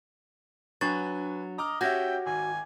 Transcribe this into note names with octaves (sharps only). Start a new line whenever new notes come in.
F#3 D4 B4 G#5 C#6 A6
D#5 A#5 D6 F6
C#4 F#4 G4 E5 F#5 G5 G#6 A#6
G#1 G#5